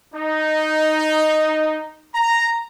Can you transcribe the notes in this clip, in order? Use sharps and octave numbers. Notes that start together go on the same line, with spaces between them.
D#4
A#5